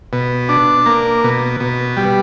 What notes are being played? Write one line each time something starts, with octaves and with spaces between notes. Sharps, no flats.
B2
D4
A#3
B2
B2
G3